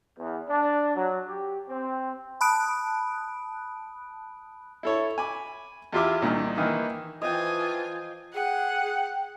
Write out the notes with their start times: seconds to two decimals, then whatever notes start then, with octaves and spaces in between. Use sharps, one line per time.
0.17 E2
0.48 D4
0.95 F#3
1.27 G4
1.67 C4
2.41 A5 B5 D#6 F#6 D7
4.83 E4 A4 C#5
5.18 G#5 B5 D6
5.93 E2 E4 F4 G4 E5 D6
6.22 C2 A#2 D#3
6.57 D#3 E3 A#3
7.22 E3 F3 F4 D#5 G5 G#5
8.34 G#4 F#5 G5